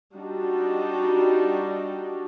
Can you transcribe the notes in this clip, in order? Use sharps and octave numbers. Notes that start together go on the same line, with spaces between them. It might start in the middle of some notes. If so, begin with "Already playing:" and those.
G3 D4 D#4 F#4